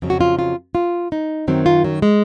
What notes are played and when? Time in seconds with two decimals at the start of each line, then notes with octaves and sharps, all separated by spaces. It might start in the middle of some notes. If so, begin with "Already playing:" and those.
0.02 F2 C#3 F#3
0.10 F#4
0.21 F4
0.39 F4
0.75 F4
1.12 D#4
1.47 F#2 D#3 F#3 C4
1.66 F4
1.84 F#3
2.02 G#3